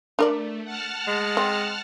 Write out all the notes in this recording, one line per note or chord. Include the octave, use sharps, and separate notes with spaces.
A3 D4 A#4 D5
F#5 A5 F6
G#3
C4